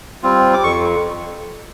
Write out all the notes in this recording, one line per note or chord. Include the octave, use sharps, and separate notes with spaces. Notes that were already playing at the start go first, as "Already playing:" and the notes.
G3 C4 F4
D6
F2 C#6